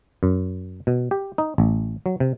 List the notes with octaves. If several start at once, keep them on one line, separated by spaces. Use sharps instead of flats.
F#2
B2
G4
D#4
A1
F#3
C3